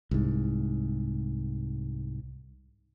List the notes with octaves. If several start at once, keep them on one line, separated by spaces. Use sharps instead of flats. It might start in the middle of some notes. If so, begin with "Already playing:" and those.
C2 G#2